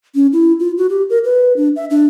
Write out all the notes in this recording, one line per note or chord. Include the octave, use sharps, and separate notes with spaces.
C#4
E4
F4
F#4
G4
A#4
B4
D4
E5
D4